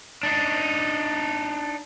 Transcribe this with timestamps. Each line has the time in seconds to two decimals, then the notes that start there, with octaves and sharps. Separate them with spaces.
0.23 D4 D#4